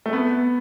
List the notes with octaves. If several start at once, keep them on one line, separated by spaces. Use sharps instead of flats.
A3
B3